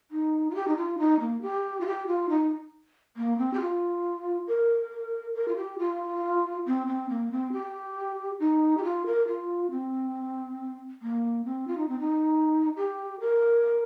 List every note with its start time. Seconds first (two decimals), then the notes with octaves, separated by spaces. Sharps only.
0.11 D#4
0.50 F4
0.55 G4
0.68 D#4
0.77 F4
0.99 D#4
1.20 A#3
1.42 G4
1.81 F4
1.86 G4
2.07 F4
2.29 D#4
3.17 A#3
3.38 C4
3.54 G4
3.60 F4
4.48 A#4
5.35 A#4
5.48 F4
5.56 G4
5.79 F4
6.66 C4
6.87 C4
7.09 A#3
7.32 C4
7.53 G4
8.40 D#4
8.77 G4
8.83 F4
9.06 A#4
9.28 F4
9.71 C4
11.02 A#3
11.45 C4
11.68 F4
11.78 D#4
11.89 C4
11.99 D#4
12.77 G4
13.21 A#4